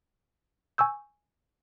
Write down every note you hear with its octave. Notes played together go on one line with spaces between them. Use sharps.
G#5 C#6 E6 G6